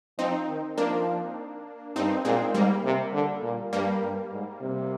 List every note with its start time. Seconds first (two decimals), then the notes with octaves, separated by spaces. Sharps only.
0.19 F3 C4 D#4
0.49 D#3
0.78 F3 A#3 D4
1.96 G2 C4 D#4
2.25 A#2 G#3 C4
2.54 G#2 G3 A#3
2.84 C3
3.13 D3
3.43 A#2
3.73 G2 G3 A#3
4.02 G2
4.32 G#2
4.61 C3